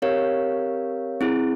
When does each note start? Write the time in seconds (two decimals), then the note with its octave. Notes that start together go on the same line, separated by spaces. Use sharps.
0.02 C4 G4 A#4 C#5 F5
1.21 C4 E4 G#4